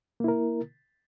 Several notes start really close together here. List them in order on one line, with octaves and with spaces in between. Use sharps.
A#3 E4 A#4